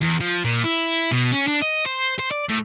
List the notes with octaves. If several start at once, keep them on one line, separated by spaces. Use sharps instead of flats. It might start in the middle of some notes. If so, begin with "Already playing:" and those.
E2
F3
A#2
E4
B2
C#4
D4
D#5
C5
C5
D5
A2